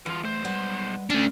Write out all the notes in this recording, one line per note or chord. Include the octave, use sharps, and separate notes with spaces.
E2 E3 F4
B1 A3 C5
G3 G#3 B4 F#5
A3 C#4 D4